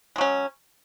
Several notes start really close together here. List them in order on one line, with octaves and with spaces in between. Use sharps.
G#3 F#3 C#4